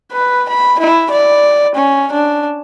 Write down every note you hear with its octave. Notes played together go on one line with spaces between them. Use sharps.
B4
B5
E4
D5
C#4
D4